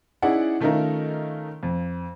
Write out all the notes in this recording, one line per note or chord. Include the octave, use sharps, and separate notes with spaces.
C#4 D#4 E4 G#4 D5 F#5
D#3 A3 C#4 D#4 F4 A#4
F2